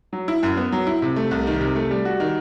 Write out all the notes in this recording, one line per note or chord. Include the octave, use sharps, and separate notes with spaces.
F#3
E4
F#2
B3
F#3
E4
C3
A3
C2
D#3
C3
A3
G3
F#4
D#3